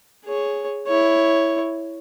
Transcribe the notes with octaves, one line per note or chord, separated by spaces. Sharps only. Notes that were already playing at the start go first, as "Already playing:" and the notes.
G#4 C#5
E4 C#5